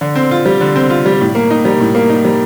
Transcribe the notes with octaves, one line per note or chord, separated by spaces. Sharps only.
D3
C4
F4
G3
D3
C4
F4
G3
A2
A#3
D#4
G3
A2
A#3
D#4
G3